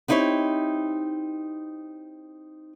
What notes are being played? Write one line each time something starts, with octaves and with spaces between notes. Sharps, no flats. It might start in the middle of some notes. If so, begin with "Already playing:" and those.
B3 C4 D#4 E4 G4 C#5